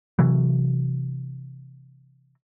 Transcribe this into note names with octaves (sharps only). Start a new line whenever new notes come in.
C3 E3 F#3